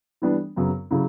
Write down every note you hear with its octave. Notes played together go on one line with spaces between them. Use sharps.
E3 G3 B3 D4
F#2 C#3 F#3 B3
C#3 F#3 C#4 E4